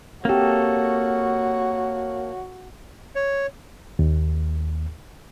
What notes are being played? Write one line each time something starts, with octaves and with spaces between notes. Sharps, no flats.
A#3 C4 F#4 G4 A4 C#5
C#5
D#2